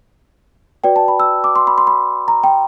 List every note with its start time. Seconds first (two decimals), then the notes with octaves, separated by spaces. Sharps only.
0.84 F#4 B4 D5 G5
0.96 A5
1.08 B5
1.20 E6
1.44 D6
1.56 C6
1.67 B5
1.78 C6
1.87 B5
2.28 A#5
2.44 G5